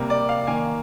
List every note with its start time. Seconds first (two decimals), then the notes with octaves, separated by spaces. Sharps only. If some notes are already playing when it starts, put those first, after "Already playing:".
Already playing: C3 G3 A#3
0.10 D5
0.29 F5
0.47 D#3 A#3 G#5